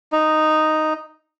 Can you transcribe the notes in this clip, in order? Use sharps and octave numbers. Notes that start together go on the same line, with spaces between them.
D#4